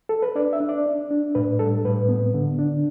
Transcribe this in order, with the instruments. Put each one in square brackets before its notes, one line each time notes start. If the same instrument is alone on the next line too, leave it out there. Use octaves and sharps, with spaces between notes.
[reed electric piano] A4
B4
D4 D5
E5
D4
D5
D4
D4
A2 B4
G3 A4
A2 B4
B3
D3
D4